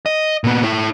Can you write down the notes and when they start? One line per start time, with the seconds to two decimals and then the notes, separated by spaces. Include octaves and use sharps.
0.06 D#5
0.44 A#2 B3
0.63 E4 C#5